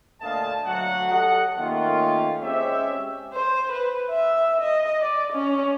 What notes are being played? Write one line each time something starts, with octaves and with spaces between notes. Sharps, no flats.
D2 A#2 D3 D#5 F5 A5
D2 F#3 F#4 F#5
F#3 G4 A4 D#5 F#5
D#3 A3 A#3 C#4 F4
G#3 C4 C#4 G4 C#5 E5
C5
B4
E5
D#5
D5
C#4